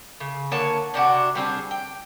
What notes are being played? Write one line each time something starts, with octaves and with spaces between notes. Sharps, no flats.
C#3
D3 A#3 C#5 A5
C3 D4 D#4 F#4
G3 C4 D4 G#4
G5